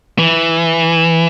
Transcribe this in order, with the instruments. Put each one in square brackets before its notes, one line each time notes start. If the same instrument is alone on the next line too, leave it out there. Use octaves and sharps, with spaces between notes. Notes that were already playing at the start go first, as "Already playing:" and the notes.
[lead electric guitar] E3